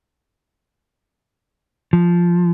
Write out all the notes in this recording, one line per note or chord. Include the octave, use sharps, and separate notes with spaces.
F3